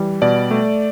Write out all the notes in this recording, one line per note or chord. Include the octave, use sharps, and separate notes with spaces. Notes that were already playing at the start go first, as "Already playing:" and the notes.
Already playing: E3 G3
B2 D5
A3